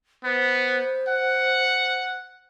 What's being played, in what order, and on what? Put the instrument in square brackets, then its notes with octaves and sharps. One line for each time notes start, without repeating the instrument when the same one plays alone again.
[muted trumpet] B3 [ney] C5
[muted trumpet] F#5